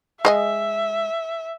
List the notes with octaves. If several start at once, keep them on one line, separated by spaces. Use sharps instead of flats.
G#3 D#5 E5 G#5